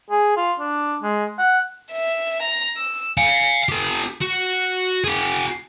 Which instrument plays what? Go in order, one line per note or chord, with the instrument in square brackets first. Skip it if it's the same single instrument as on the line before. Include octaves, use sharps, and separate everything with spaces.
[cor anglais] G#4
F4
D4
G#3
F#5
[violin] E5
A#5
E6
[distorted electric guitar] F5 G#5
G4 A4
F#4
F#4 G#4